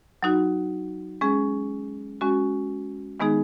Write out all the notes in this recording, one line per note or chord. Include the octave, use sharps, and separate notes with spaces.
F#3 D#4 F#4
G#3 C#4 G#4
G#3 C#4 F#4
D#3 G#3 B3 D#4 G#4